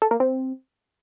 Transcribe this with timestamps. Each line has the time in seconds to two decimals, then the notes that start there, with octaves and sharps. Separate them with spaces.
0.02 A4
0.11 A#3
0.20 C4